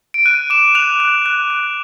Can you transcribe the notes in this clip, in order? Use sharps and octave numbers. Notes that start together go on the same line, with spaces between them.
D7
F#6 D#7
D6 E7
F#6 F7
F#6
F#6
F#6